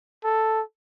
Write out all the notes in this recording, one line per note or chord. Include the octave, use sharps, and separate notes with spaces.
A4